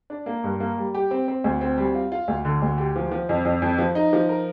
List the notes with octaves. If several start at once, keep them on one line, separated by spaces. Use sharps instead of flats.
D4
A#3
G2
A#3
G3
G4
C4
C4
D2
C4
G3
F4
F4
D2
D3
D2
G4
F3
F3
F2
F2
F2
F3
D#4
F3
A#4